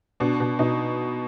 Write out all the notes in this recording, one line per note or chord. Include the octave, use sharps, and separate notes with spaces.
B2 D4
B2
B2 D#4